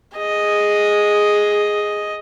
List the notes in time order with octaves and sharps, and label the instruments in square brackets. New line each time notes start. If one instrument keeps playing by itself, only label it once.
[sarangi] G#4 [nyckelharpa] D#5